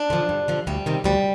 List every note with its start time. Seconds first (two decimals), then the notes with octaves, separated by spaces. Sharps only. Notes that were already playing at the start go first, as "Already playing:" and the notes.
Already playing: D4
0.10 D3 F3
0.29 G2
0.48 D3 F3
0.67 D2 G3
0.86 C3 D#3
1.04 D2 G3